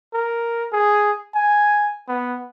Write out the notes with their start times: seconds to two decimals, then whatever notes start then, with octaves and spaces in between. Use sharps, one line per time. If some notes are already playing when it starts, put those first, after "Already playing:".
0.14 A#4
0.73 G#4
1.35 G#5
2.08 B3